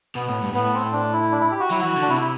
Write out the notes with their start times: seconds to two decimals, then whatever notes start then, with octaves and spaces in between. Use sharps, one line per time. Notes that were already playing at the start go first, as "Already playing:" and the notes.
0.15 B2 B3
0.28 A2
0.41 G2
0.54 A2 B3
0.74 C4
0.93 D4
1.13 E4
1.32 D4
1.41 E4
1.52 G4
1.60 F#4
1.71 F#3 E4
1.80 E3 F#4
1.97 D3
2.02 D4
2.09 C3 E4
2.22 E4